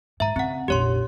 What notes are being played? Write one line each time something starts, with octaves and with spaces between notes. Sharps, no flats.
G#2 E5 A#5
C#3 C4 F#5
F1 A#1 G4 C#5 C6